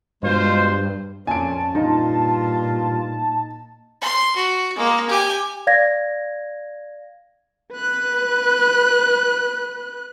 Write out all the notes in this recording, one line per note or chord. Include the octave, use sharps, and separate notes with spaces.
G2 B2 G#3 F4 C5
F2 A#2 C#4 G#5 A5 D7
G2 A#2 D#4 F4
C6
F#4
G#3 A#3
G4 G#5
D5 F5 G#6 A#6
B4 F#6